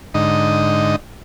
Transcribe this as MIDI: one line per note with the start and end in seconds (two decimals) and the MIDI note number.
0.14 0.96 44
0.14 0.96 50
0.14 0.96 63
0.14 0.96 75